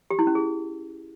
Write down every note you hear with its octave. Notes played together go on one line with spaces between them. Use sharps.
G4
E4
C#4
G#4